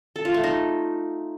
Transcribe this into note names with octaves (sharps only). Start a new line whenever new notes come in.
A4
F4
A3
D#4